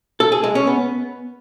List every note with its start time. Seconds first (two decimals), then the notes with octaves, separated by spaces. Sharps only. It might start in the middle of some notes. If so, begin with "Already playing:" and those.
0.20 A4
0.32 G#4
0.44 G#3
0.55 C#4
0.67 B3